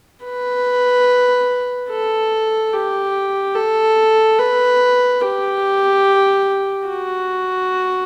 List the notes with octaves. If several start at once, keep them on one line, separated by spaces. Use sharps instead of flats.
B4
A4
G4
A4
B4
G4
F#4